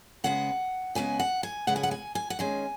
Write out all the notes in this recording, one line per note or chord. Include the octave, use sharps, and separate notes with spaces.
C#3 G#3 B3 F#5
C#3 G#3 B3 G#5
F#5
G#5
C#3 G#3 B3 F#5
G#5
F#5
G#5
G#5
F#5
D#3 G#3 C#4 G#5